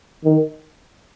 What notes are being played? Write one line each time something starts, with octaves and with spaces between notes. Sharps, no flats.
D#3